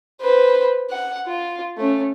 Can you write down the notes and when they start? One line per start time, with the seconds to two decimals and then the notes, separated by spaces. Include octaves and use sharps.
0.20 B4 C5
0.90 F#5
1.27 F4
1.77 A3 C#4